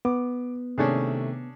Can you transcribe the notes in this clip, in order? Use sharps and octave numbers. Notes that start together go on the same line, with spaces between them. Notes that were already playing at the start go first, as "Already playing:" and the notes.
B3 D6
C3 D#3 A3 C#4 D4 G#4